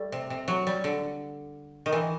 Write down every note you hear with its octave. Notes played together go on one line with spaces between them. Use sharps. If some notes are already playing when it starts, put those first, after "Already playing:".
Already playing: G3 A3
C3
C3
F#3
G3
D3
D#3
E3